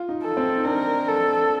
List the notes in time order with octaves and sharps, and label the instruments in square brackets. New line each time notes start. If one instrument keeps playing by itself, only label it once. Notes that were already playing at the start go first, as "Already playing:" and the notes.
Already playing: [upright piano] F4
D#4
[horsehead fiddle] A4
[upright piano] C4
D#4
[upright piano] D4 [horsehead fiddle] A#4
[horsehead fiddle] A4